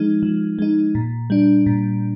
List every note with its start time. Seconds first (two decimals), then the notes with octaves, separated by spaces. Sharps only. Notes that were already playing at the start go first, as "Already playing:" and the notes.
Already playing: F3 G#3 D#4
0.23 F3
0.59 G#3 D#4
0.95 A#2
1.30 G3 D4
1.66 A#2